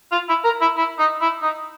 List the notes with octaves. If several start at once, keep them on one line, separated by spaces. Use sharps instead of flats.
F4
E4
A#4
E4
E4
D#4
E4
D#4